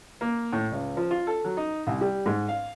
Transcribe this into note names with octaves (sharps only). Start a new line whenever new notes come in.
A#3
A2
C#2
F3
F4
A4
F#3
D#4
C2
G3
G#2
F5